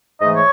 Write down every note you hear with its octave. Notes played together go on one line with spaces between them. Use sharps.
G#2 E3 A3 D#5
C#5